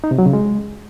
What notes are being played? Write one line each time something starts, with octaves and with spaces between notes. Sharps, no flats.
D#4
C3
F#3
C#3
G#3